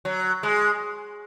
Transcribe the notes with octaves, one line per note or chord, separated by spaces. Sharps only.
F#3
G#3